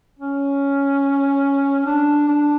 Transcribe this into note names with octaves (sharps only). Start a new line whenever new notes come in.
C#4
D4
D4